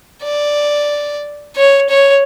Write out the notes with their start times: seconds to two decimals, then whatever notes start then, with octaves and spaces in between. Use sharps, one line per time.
0.23 D5
1.56 C#5
1.89 C#5